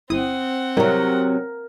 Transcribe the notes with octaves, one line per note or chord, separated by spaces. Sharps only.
G1 C4 E4 F#5 D#6
C3 F#3 G3 E4 A#4